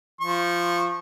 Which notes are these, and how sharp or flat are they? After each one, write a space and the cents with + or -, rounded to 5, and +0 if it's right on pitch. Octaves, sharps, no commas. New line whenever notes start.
F3 -5 C#6 -25